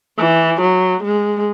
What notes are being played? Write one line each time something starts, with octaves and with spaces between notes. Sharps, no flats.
E3
F#3
G#3